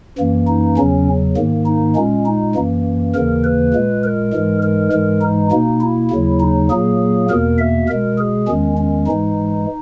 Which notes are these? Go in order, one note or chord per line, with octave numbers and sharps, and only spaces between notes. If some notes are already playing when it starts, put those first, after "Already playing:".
F#2 E3 A#3
D#4
E2 C#3 F#3 C#4
G#2 D#3 A#3
D#4
A#2 G#3 C#4
D#4
F#2 E3 A#3
D#2 C#3 E3 A#3 A#4
B4
A#2 G#3
A#4
G#2 E3 G#3
A#4
G#2 E3 G#3 A#4
D#4
B2 A#3 D#4
E4
D#2 C#3 F#3
D#4
A#2 F#3 A#3 G#4
E2 B2 A#3 A#4
E5
B2 G#3 A#4
G#4
E2 D#3 G#3 C#4
C#4
G#2 E3 G#3 D#4